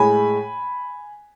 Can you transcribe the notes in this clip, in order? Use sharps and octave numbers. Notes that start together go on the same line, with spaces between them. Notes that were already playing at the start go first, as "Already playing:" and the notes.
Already playing: A2 G#3 G#5 B5